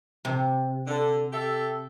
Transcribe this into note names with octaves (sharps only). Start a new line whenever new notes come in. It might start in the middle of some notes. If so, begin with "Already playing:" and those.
C3
D3
G4 A4 E5